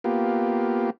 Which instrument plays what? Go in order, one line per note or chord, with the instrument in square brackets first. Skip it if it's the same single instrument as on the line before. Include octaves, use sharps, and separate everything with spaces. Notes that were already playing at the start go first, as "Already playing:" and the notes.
[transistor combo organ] A#3 B3 F4 G4